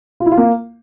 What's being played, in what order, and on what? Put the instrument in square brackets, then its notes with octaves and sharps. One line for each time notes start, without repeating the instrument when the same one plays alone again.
[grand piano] F4
E4
F4
A#3